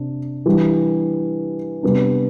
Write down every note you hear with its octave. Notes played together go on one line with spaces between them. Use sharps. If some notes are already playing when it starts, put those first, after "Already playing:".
Already playing: C3 D4
E3 G3 D4
C3 G3 B3 D4